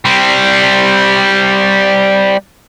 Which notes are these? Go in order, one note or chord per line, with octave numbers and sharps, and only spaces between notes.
G3 C4